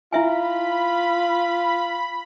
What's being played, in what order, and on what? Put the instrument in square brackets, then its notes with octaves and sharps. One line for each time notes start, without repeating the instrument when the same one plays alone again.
[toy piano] E4 E5 G#5 [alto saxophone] F4 [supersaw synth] B5